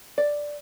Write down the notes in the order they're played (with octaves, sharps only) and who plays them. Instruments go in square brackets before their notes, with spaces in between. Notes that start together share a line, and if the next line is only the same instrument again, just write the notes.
[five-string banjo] D5